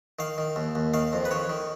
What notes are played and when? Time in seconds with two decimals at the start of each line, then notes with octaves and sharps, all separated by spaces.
0.19 D#3 F5
0.38 D#3
0.56 D#2
0.75 D#2
0.94 D#3 F5
1.13 F2
1.25 B4
1.31 D#3 C#5
1.49 D#3